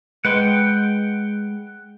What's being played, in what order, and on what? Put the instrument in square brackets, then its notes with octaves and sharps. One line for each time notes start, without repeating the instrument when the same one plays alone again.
[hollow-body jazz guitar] G#3 B4 [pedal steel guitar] F#5 G5